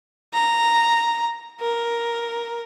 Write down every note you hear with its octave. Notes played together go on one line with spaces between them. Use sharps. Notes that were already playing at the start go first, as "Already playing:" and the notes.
A#5
A#4